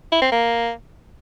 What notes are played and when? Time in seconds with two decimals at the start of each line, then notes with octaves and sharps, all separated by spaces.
0.12 E4
0.22 C4
0.32 A#3